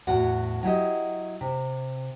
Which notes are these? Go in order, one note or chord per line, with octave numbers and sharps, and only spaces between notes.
E2 A2 F#4 F#5
F#3 E4 G4 D#5
C3